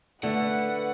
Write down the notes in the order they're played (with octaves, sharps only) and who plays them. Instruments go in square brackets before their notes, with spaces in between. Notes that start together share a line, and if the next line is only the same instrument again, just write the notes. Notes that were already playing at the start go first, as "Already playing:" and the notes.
[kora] D3 [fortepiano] A3 [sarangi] B4 [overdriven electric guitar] F#5